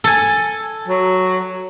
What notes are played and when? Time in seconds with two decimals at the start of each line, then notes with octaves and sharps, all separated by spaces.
0.04 A4 G#5
0.88 F#3